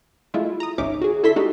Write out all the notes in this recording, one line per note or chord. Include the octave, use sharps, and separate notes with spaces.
G#3 A3 E4 F4
A#5 D#6
G#1 C#2 C#4 D#4 E5 D6
F#4 G#4
D3 E4 A4 E5 C6 B6
G#3 D4 D#4 F#4 G4 A4